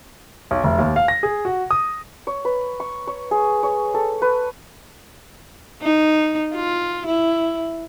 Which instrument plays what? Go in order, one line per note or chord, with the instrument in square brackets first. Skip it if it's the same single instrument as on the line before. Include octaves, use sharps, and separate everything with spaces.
[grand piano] B1
F1
D#2
F5
A#6
G#4
F#4
D#6
[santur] C#5
B4
C#6
C#5
G#4
C#5
A4
B4
[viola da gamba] D#4
F4
E4